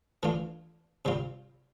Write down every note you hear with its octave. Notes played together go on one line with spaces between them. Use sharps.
E3 A3 D4 F4
C3 G3 C4 F4